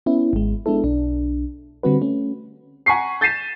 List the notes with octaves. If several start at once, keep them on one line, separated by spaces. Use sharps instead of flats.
B3 C#4 E4
G#1 G#3
G#3 B3 D4 E4 A4
B1 D4
D3 G3 C4 F#4 B4
A3 C#4
F#5 G#5 A#5 C#6 B6 C7
G6 A6 B6 C7 D#7 E7